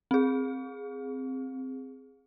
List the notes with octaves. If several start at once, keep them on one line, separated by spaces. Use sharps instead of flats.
C4 G#4